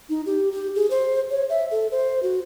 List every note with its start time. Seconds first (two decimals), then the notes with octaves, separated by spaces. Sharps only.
0.09 D#4
0.26 G4
0.52 G4
0.75 G#4
0.90 C5
1.30 C#5
1.50 E5
1.71 A4
1.91 C5
2.23 F#4